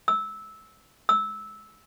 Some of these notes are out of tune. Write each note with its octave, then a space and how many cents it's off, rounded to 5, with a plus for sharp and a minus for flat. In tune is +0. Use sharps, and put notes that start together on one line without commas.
E6 -15
E6 -15